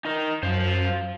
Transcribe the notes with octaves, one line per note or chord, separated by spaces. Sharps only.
D#4 A#4
F#2 C5 F5